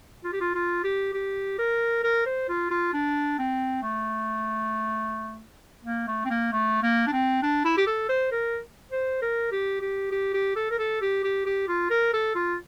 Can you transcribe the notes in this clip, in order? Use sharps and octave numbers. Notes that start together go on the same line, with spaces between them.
F4
G4
F4
F4
G4
G4
A#4
A#4
C5
F4
F4
D4
C4
A3
A#3
A3
C4
A#3
A3
A#3
D4
C4
D4
E4
G4
A4
C5
A#4
C5
A#4
G4
G4
G4
G4
A4
A#4
A4
G4
G4
G4
F4
A#4
A4
F4